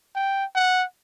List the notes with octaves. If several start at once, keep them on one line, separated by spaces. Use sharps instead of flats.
G5
F#5